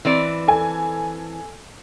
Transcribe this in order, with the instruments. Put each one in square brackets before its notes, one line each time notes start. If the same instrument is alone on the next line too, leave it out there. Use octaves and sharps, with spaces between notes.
[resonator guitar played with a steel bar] E3 C4 D5
[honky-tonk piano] A4 G#5